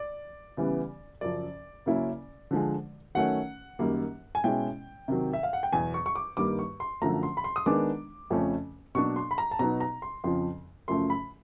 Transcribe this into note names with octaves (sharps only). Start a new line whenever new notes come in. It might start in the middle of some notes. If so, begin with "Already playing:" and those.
Already playing: D5
C#3 E3 G3 B3
F#2 C#3 F3 D5
C#3 F#3 A#3 C#4 E4
D3 F3 G#3
D#3 F#3 A3 C#4 F#5
F#2 D#3 G3 A#3
G#5
B2 G#3 C#4 E4 G5
C3 D#3 F#3
E5
F5
F#5
G5
E2 B2 F#3 G#5
C#6
C#6
D6
G2 D#3 G3 A#3 D6
C#6
C6
F#2 D3 F3 A3 A#5
C6
B5
C6
D#6
D#3 G#3 B3 D4 D6
F2 C#3 F3 A3 C#4
B2 F#3 A#3 D4 C#6
C6
B5
A#5
A5
B2 F#3 B3 D#4 A#5
A#5
C6
F2 C#3 F3 C6
F#2 C#3 F3 A3 C6
B5